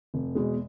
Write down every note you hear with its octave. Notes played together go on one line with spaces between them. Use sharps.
F1
E2 B2 G#3